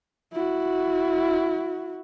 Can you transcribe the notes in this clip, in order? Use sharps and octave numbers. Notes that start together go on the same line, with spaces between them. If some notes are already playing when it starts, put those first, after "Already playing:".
E4 F#4